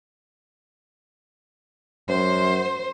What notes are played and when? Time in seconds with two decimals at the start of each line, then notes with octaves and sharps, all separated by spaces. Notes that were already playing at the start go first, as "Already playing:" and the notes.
2.09 F#2 C5